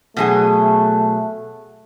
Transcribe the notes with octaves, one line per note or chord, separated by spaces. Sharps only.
B2 F#3 A3 G#4